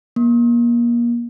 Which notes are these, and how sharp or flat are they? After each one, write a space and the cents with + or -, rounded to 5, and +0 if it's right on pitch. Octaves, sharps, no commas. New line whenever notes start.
A#3 +30